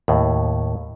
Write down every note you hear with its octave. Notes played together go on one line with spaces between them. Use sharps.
D#2 A2